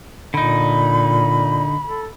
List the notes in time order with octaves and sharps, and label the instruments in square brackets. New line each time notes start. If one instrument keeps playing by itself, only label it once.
[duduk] A#2 [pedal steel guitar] D3 D#4 [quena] B5
[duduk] A4